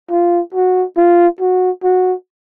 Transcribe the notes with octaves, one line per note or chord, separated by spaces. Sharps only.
F4
F#4
F4
F#4
F#4